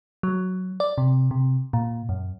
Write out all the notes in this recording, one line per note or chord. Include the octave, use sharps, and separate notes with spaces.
F#3
D5
C3
C3
A#2
F#2